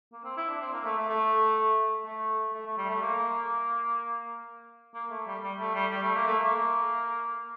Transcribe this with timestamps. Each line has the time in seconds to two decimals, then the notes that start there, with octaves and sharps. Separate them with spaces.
0.13 A#3
0.24 C4
0.37 E4
0.49 D4
0.61 C4
0.73 A#3
0.85 A3
0.97 A3
1.09 A3
2.06 A3
2.53 A3
2.66 A3
2.78 G3
2.90 A3
3.02 A#3
4.94 A#3
5.11 A3
5.27 G3
5.43 G3
5.59 A3
5.75 G3
5.91 G3
6.03 A3
6.15 A#3
6.27 A3
6.39 A#3